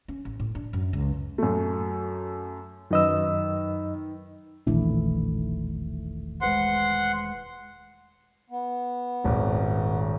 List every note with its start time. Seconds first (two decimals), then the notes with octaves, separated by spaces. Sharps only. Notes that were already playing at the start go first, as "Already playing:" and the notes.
0.08 C#4
0.25 A1
0.40 A2
0.55 D4
0.73 F#2
0.93 C#2
1.38 F#2 A3
2.91 F#2 D#3 B4 D#5 E6
4.67 E1 A#1 D#3 E3 A3 D4 E4
6.41 G#3 B4 C5 F#5 C6
8.50 B3
9.24 D#1 G#1